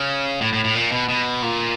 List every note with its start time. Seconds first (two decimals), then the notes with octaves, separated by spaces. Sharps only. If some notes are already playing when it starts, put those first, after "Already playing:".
Already playing: C#3
0.41 A2
0.53 A2
0.64 A2
0.75 A#2
0.91 B2
1.09 B2
1.42 A#2